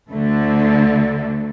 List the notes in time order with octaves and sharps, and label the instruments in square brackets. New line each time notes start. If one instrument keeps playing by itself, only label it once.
[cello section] D2 D3 A3